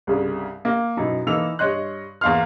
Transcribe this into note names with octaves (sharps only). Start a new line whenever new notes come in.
C2 G2 C#3
A#3
F#2 B2 D#4 E4
E3 A#3 D#4 A4 E6 F7
G2 C#5 D#5 C6 F#6
E2 A#3 F5 C6 F6